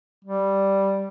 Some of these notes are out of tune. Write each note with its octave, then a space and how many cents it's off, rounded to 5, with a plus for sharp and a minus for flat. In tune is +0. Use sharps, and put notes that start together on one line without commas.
G3 -5